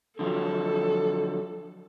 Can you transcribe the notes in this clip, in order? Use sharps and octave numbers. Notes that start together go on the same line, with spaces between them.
D3 F3 F#3 A4